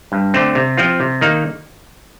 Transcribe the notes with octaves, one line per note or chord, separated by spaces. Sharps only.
G2
D3 A3 C4
C3
F3 C4 F4
C3
D#3 A#3 D#4